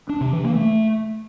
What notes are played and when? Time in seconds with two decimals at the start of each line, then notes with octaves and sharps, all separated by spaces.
0.09 D4
0.21 C3
0.32 E3
0.44 A#3
0.56 A3